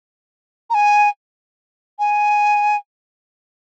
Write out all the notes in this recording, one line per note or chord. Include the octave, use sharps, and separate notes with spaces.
A#5
G#5
G#5